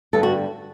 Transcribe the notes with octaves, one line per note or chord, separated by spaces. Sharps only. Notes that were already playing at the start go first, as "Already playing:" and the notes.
G2 D3 G3 B3 A4
F#4